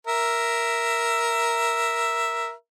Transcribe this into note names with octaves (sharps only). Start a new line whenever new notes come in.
A#4 E5